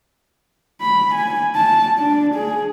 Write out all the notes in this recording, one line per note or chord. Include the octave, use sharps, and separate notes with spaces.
B5
G#5
A5
D4
G#4